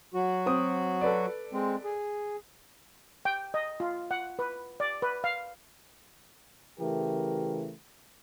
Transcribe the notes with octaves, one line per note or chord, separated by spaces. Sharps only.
F#3 F#4
C4 D#6
A4 B4 D5
G#3 C4
G#4
G5
D#5
F4
F#5
B4
D5
B4
F5
C#3 E3 A3 G4 A#4